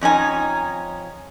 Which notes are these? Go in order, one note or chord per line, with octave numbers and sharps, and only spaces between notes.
F2 C#4 D#4 G#5